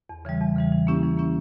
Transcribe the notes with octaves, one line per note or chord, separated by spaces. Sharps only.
E2
C#3 E3 G3
E2
C#3 E3 G3
E3
A#3 C#4 E4 G4
E3
A#3 C#4 E4 G4